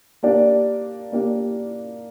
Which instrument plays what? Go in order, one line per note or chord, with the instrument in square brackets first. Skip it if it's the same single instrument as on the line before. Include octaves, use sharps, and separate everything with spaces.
[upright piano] A#3 D4 G4 D5
A#3 D4 G4 D5